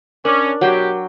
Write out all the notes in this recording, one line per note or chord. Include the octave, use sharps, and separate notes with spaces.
C#4 D4 A#4 D6
B2 F#3 F#4 G4 G5 C6